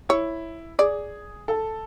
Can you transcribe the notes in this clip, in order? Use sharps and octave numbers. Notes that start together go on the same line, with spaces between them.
E4 C#5
G#4 D5
A4